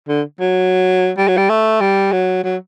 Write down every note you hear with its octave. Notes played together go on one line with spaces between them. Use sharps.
D3
F#3
G3
F#3
G3
A3
G3
F#3
F#3